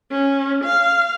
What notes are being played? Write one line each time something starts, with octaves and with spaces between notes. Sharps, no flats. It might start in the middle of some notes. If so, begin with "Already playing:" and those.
C#4
F5